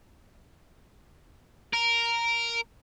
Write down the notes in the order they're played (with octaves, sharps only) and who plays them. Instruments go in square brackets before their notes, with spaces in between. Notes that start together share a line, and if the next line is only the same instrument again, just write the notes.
[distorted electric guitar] A#4